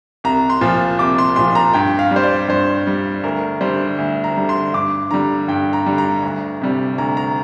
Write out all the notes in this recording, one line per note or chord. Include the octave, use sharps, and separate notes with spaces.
C2 A#5
C6
A#2 F3
C2 D6
C6
A#2 F3 C6
A#5
G2 G5
F5
G3
C5
D5
G2 C5
G3
D2 A#4
D3 G3 C5
D2
A#5
D3 G3
C6
G2 D6
D3 G3 A#5
G2 G5
A#5
D3 G3
A#5
D2
C3 G3
D2 A#5
A#5